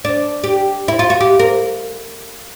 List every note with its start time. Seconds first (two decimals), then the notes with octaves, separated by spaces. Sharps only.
0.05 D4
0.44 G4
0.88 E4
0.99 F4
1.10 F#4
1.20 G4
1.39 A#4